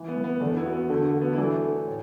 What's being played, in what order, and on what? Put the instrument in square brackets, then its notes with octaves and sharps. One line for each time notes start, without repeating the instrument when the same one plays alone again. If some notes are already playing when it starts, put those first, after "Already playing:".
Already playing: [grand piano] E3
[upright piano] B3
[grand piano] E3
[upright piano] B3
[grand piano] E2 [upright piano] A3 D4
[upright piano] B3 E4
[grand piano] F#4
[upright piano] B3
[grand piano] D3 [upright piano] A3
[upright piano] A3
[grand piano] F#4
[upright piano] B3
E4
[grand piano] E3 [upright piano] A3 D4
[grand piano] A4
A2